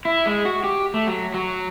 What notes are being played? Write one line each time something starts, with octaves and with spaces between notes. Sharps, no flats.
E4
G#3
F#4
G4
A3
F#3
F#3